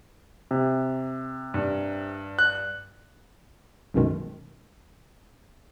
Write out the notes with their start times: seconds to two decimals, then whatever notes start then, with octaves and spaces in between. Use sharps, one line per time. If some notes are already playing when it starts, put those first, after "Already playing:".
0.51 C3
1.54 G2
2.39 F#6
3.94 B1 F#2 B2 D#3 G#3